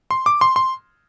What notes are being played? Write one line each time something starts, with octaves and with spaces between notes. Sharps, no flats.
C6
D6
C6
C6